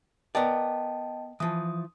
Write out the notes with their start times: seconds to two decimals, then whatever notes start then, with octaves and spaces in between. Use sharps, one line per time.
0.35 B3 A#4 D5 D#5 G5 A5
1.40 E3 F3 D#6